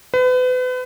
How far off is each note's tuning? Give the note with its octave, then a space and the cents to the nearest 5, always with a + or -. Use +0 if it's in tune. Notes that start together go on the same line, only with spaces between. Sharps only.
B4 +35